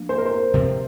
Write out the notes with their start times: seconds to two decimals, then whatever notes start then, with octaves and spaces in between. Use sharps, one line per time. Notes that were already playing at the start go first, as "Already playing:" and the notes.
Already playing: F3 A#3 D4
0.09 C5
0.18 A#4
0.26 C5
0.54 C3 F3 C4